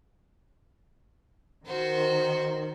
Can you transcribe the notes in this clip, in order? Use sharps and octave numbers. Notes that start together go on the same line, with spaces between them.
D#3 F#4 C5